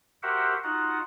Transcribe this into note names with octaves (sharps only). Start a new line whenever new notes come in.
F#4 G4 A#4 C5 E5 F#5
D#4 F4 F#4 F#5